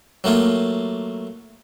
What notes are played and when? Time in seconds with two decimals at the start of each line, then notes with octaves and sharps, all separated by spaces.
0.24 F#3 A3 A#3 F4